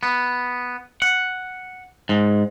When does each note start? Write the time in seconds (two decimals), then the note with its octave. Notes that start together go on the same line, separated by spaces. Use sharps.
0.03 B3
1.02 F#5
2.09 G#2